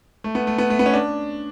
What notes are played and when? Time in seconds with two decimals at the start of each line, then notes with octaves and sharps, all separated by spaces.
0.24 A3
0.35 B3
0.47 A3
0.58 B3
0.70 A3
0.79 B3
0.86 C#4
0.93 D4